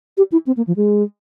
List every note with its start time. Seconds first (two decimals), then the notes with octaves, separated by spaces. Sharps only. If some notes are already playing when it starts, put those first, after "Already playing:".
0.17 G4
0.32 E4
0.47 C4
0.57 A#3
0.67 F3
0.76 G#3